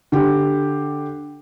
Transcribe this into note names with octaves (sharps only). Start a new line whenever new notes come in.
D3 G4